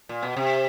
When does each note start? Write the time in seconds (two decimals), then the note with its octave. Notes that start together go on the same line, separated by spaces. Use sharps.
0.09 A#2
0.23 B2
0.36 C3